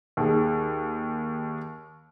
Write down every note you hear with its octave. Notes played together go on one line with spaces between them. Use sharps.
D#2 G#4